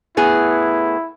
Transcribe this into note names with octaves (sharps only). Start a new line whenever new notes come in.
A2 B3 E4 G#4